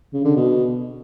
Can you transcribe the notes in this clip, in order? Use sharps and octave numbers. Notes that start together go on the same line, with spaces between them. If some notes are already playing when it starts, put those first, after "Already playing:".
C#3
D3
B2